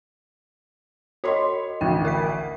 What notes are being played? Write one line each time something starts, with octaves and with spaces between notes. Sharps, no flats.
F#4 C#5 D#5 B5 C6
A1 D2 G5
A#4 E5 B6